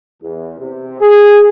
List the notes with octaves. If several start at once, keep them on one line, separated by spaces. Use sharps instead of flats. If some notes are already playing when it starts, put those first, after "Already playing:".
E2
C3
G#4